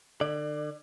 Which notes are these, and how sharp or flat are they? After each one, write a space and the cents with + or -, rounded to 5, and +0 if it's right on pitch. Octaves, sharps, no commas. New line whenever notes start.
D3 +40 D5 +20